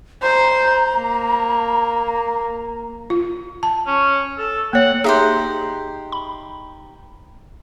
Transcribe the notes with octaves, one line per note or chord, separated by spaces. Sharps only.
C5 A#5
A#3
F4
A5
C#4
A4
A#3 C#5 F#5
D#4 G4 G#4 C5 E5
B5